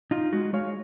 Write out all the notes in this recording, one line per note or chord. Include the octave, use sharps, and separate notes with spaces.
D#4 F4
G#3 F#4
G#3 C#5 F5